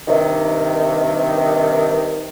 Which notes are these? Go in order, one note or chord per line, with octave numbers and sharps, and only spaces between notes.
G2 C3 D#3